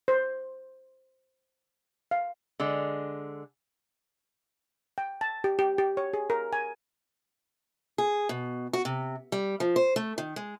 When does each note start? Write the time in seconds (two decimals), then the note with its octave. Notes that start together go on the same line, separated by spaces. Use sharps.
0.08 C5
2.11 F5
2.60 D3 G#3
4.98 G5
5.21 A5
5.44 G4
5.59 G4
5.78 G4
5.97 C#5
6.14 G#4
6.30 A#4
6.53 G#5
7.98 G#4
8.29 B2
8.73 F#4
8.85 C3
9.32 G3
9.60 F3
9.76 C5
9.96 A3
10.18 D#3
10.36 G#3